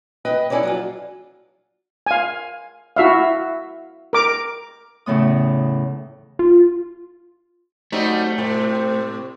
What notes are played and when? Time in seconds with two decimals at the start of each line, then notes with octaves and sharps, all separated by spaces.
0.25 B4 D#5 G5
0.50 E4 G#4 A4 C#5 D5
0.63 F#3 D4 F4
2.06 F5 G#5
2.96 E4 F#4 E5 F5
4.13 A#4 D6
5.06 E2 A2 C#3 B3 D#6
6.39 F4
7.92 F#3 G3 A3 C4 D#4
8.38 A2 C3 C4